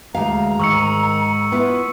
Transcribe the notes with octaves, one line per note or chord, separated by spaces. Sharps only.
D2 E3 G#3 F5 A#5
G#2 D#3 C#6 E6 C#7
B3 E4 F4